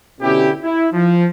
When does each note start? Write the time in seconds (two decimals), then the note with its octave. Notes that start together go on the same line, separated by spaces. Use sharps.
0.21 B2 D3 C#4 E4 G4
0.63 E4
0.93 F3